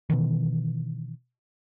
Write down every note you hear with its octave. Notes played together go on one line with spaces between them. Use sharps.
B2 D#3 E3